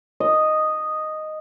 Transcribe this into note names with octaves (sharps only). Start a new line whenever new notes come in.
D#5